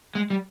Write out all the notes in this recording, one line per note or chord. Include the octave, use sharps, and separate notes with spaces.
G#3
G3